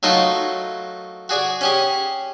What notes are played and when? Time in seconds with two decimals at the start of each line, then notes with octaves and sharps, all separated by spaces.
0.03 F#3 A3 D#4 F4 A#4
1.29 F#4 G#4 D5
1.61 C#4 G4 G#4